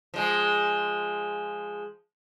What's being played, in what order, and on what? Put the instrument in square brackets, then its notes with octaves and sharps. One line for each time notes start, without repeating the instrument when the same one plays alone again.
[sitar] F3 G#3